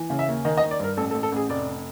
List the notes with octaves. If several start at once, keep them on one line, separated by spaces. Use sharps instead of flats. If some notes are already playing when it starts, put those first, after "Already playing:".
Already playing: E3
C#3
E5
D#2
D#3 D#5
D#5
D#3
D5
G2 A#4
A1 A4
A4
A1
A4
A1 G#4
F1 D5